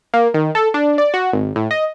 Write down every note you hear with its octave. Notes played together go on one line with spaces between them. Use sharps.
A#3
D#3
A4
D4
D5
F#4
G#1
A2
D#5